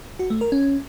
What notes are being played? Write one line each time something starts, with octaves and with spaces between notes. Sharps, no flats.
F#4
A3
A#4
C#4